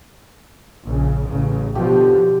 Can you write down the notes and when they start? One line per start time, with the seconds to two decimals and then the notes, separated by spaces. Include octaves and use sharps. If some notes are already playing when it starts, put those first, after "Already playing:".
0.85 A#1 C#3
1.26 A1 C#3
1.75 B2 D3 F3 G4